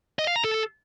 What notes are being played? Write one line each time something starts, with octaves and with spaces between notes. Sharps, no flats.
D#5
F5
A#5
A4